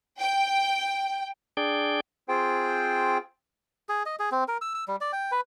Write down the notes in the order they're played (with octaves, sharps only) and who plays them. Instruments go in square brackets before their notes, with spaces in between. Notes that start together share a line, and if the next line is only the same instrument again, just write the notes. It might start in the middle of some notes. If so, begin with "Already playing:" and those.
[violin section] G5
[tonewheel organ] D4 G#4 D5 G5
[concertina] C4 F4 G#4 C5 G5
[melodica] G#4
D#5
G#4
C4
A#4
E6
E6
G3
D5
G5
B4